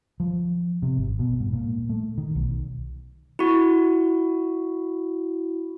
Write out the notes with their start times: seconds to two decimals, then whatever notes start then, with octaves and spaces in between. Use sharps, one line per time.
0.20 F3
0.82 C3
0.97 G#1
1.19 B2
1.40 G#2
1.53 A#2
1.89 A3
2.18 D#3
2.35 B1
3.39 E4 F#4